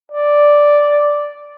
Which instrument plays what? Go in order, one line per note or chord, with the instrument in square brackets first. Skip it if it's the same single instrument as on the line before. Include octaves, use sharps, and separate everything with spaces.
[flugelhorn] D5